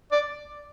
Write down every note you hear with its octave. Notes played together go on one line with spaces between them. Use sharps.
D5